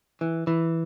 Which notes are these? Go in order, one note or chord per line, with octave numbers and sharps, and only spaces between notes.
E3
E3